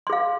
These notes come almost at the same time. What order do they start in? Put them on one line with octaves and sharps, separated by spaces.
C6 G#4 F5